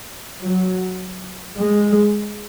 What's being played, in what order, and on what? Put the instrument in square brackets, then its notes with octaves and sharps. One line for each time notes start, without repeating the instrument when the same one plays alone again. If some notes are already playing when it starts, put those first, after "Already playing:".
[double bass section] F#3
G#3